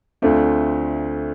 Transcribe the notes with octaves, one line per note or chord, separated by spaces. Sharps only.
D2 D3 A3 C4 F4